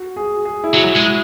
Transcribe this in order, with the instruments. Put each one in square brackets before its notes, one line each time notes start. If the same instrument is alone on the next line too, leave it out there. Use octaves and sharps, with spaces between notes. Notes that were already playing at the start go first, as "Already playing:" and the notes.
Already playing: [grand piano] F#4
G#4
G#4
E4
[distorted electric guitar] F#3 [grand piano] F#4
[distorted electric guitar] G#3